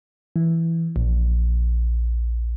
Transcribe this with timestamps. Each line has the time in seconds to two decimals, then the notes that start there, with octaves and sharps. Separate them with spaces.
0.36 E3
0.96 A#1